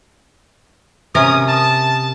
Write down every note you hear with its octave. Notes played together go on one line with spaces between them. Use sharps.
C3 C#4 A#4 D#6
A5